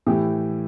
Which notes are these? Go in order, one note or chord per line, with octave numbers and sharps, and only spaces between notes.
A2 E3 G4